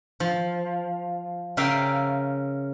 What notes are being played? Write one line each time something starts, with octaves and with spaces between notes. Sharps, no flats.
F3
C#3 A#4 E5 F5 G5